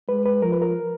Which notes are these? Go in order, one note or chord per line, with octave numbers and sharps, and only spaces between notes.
G#3 B4
B4
F3 A#4
B4
A#4